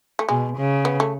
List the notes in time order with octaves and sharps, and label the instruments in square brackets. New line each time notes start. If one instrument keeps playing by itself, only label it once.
[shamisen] A3
[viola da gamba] B2 [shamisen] G#3
[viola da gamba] C#3
[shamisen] B3
A3